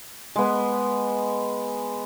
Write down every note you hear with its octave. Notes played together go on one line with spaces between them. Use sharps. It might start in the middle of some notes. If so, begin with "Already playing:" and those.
G#3 B3